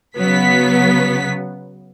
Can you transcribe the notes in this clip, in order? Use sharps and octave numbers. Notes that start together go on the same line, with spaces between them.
C#3 F#3 B3 B6